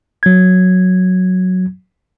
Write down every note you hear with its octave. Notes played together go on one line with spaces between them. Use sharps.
F#3 G#6